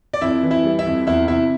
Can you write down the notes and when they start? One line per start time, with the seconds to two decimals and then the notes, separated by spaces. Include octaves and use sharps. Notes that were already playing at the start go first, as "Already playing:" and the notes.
0.13 D5
0.21 F2 E4 E5
0.43 E3
0.51 E4 E5
0.64 G3
0.79 E4 E5
0.86 F2
1.07 E2 E4 E5
1.28 C3 E4 E5